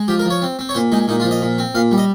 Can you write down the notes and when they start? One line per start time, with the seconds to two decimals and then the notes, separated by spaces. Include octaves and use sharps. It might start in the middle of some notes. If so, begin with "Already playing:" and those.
Already playing: G#3
0.08 F3 G4
0.19 A#4
0.25 F3
0.30 C#5
0.42 C4
0.59 C4
0.69 C#5
0.74 A#2 C5
0.92 G#3 D#4
1.08 A#2 D#4
1.20 F4
1.24 F3
1.31 D#5
1.41 A#2
1.58 C4
1.75 A#2 F5
1.91 G3
1.98 D#5